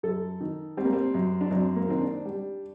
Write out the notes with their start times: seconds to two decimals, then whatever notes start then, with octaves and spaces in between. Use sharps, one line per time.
0.03 F#2 A4
0.41 D#3
0.77 G3 C4
0.85 A#3
0.93 C4
1.14 F#2
1.41 D4
1.51 F#2 C4
1.76 A#3
1.89 D#3 C4
2.01 D4
2.25 G3